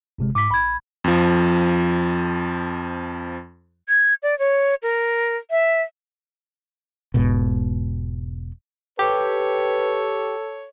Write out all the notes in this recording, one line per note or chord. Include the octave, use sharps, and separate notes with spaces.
G1 C3 G#3
G#2 D6 B6
A#1 B5 G#6
F2 F3
G#6
D5
C#5
A#4
E5
E1 G#2 B2
G4 A4 B4 C#5